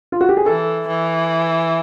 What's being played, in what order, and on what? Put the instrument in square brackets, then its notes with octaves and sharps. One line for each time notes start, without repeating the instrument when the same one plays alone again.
[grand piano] F4
F#4
G4
G#4
[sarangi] E3 [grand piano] A4
[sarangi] E3